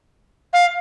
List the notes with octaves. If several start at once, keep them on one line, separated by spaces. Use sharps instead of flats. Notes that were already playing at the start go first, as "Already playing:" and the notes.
F5